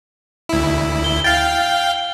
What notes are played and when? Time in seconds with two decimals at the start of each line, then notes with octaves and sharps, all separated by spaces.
0.49 D2 E4
1.04 G7
1.24 F5 G5 A6